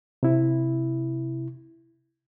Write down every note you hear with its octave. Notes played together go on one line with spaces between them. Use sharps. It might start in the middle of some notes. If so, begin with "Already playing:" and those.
C3 E4